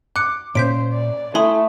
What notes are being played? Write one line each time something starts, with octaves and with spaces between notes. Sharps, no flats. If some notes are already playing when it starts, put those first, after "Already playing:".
D6 F#6 C#7
A#2 C#4 C5 G6 B6 D7
D5
A3 E4 E5 G#5 B5 C6 D#6